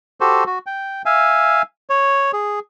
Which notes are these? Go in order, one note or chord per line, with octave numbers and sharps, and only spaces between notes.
F#4 G4 A4 C5
F#4
G5
E5 F5 G#5
C#5
G#4